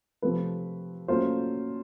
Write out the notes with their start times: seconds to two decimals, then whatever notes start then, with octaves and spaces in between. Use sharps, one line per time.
0.22 C3 F3 A3 C4 B4
1.08 A#2 F#3 A3 C#4 F4 C5